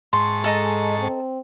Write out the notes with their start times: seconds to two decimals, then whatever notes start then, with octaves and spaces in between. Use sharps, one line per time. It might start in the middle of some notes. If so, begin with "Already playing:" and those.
0.13 G#2 A5 C6 C#6
0.44 G#3 A4 D#5 A#5
0.99 C4